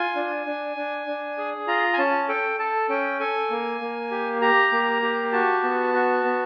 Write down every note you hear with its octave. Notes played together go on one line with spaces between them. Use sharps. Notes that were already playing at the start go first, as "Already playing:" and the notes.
Already playing: F4 G#5
D4
D4
D4
D4
G#4
F4 A#5
G#5
C#4 A5
A4 G5
A4 A5
C#4 G5
A4 G#5
A#3
A#3
G4
G4 A#5
A#3
G4
F#4 A5
B3
F#4
B3